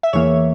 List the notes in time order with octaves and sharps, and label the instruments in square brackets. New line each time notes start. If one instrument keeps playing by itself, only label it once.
[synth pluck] E5
E2 E3 A#3 C#5